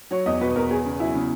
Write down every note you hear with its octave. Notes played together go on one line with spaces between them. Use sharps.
F#3 C#5
E2 D#5
B2 B4
E2 A#4
B3 G#4
C#3
F#3 E4
C#3